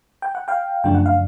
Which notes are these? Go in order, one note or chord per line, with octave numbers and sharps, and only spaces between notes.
G5
F#5
F5 G5
F#2 C#3 F3 A3 D4 G5
F#5
F5